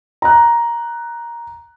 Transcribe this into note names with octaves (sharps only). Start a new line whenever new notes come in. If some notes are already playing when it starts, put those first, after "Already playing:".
A#5 F#6